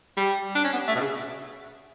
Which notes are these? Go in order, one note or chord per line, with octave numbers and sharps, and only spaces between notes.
G3
D4
C#4
B3
A3
B2
C#3